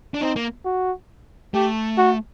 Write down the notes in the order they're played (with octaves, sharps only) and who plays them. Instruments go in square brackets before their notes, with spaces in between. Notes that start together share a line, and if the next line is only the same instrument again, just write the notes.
[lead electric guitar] D4
[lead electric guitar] C4 [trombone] D#4
[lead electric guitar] A#3
[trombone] F#4
[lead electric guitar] A3 [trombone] G4
[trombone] F#4